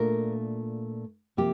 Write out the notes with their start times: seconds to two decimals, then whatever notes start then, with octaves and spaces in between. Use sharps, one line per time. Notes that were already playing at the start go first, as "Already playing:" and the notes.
Already playing: A#2 A3 D4 F4 A#4
1.37 C3 F3 A#3 G4